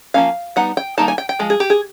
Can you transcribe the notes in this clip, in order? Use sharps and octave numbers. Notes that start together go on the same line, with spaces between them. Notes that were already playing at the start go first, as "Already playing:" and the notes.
F3 A#3 C#4 F5
G3 B3 D#4 F#5
G5
D#3 G3 A#3 D#4 A5
G#5
G5
G5
F3 G#3
G#4
G4
G#4